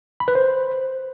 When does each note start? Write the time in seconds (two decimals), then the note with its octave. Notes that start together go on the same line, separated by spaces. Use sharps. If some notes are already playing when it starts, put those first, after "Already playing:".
0.20 B5
0.28 B4
0.35 C5